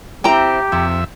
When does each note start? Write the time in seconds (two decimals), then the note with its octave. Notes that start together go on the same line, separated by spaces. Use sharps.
0.24 C4 E4 G4 G5 A#5
0.72 F2 C3 E5